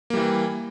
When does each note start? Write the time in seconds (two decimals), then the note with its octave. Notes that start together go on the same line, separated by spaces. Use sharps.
0.10 A#3
0.14 G3
0.17 E3